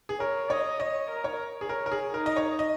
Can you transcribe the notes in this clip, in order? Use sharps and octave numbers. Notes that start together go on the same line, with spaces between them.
G#4
A#4 C#5
C#5 D#5
C#5 D#5
A#4
C#5
G#4
A#4 C#5
A#4
G#4
D#4 A#4
D#5
C#5
D#5